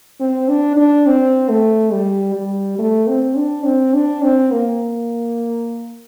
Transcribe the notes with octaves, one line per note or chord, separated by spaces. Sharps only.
C4
D4
D4
C4
A3
G3
G3
A3
C4
D4
C4
D4
C4
A#3